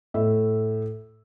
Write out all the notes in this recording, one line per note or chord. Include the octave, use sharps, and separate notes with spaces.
A2 E5